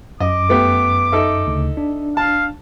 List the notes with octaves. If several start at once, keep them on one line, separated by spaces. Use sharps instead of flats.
F#2 D#5 D6
A3 B3 G4
D#4 A4 E5
D2 C#3
D4
F5 A5